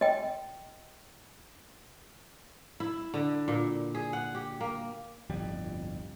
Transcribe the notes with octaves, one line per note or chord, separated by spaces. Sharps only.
D#5 G5
E4
D3
A#2
G#4
F#5
G4
A#3
D1 G1 F2 G3